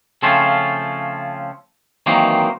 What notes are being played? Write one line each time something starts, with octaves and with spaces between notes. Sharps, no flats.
C#3 F3 A3 C4 C#4 F4
D#3 E3 F#3 A#3 C4 D#4